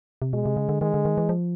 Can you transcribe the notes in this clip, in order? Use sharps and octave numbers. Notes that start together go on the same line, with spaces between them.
C3
B2 G#3
C3
C#3
D3
D#3 G#3
D3
D#3
E3
F3